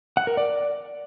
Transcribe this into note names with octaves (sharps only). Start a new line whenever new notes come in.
F#5
A#4
D5